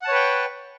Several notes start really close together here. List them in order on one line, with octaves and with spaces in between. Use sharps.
F#5 A5 C#5 B4 G5